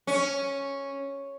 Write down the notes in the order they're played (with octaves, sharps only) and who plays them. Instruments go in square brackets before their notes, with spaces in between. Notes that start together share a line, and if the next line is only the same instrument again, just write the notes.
[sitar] C#4